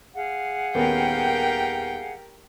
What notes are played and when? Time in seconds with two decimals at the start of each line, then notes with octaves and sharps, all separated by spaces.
0.15 G#4 F5 F#5
0.75 D#1 D#3 B3 G4 A#4 G5